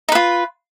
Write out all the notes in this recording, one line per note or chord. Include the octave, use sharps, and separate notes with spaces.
D#4 F4 B4